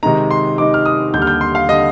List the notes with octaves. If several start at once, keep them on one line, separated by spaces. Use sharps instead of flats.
C3 D#3 G#3 D#4 A#5
C6
C3 D#3 G#3 D#4 D6
F6
D#6
D#2 D3 G3 G6
F6
G6
C6
F5
D3 G3 D#5